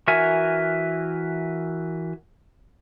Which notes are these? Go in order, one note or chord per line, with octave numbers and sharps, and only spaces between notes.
E3 F#4 A#4 E5 G#5